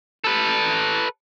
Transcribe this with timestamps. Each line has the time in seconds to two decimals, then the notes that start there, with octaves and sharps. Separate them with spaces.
0.24 A4 B4